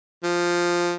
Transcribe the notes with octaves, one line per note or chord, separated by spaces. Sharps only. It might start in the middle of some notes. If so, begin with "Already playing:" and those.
F3